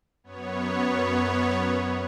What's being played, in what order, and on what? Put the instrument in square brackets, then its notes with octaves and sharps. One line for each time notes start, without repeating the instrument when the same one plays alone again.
[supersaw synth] F#2 B3 C#5